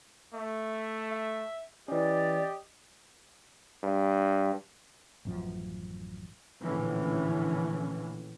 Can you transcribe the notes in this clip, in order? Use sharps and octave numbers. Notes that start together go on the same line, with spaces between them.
A3 E5
E5
E3 C#4 G4 D5 D#5
G2
A1 F#2 F3
A#1 A2 D3 E3 C#4